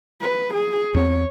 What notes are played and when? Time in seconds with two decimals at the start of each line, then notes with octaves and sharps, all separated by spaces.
0.21 B4
0.54 G#4
0.94 E2 C4 C#5